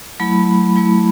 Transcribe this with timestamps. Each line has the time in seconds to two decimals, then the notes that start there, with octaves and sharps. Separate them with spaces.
0.20 F#3 A3 E4 B5
0.76 F#3 A3 E4